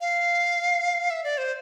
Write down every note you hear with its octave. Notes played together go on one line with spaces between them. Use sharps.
F5
E5
D5
C5